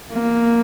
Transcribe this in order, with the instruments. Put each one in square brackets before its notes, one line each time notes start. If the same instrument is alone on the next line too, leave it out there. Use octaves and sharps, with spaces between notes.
[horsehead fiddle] A#3